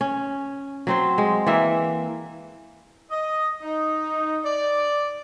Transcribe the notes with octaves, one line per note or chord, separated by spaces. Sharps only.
C#4
F#3 C4 C5
G#3
E3 A#3 E5
D#5
D#4
D5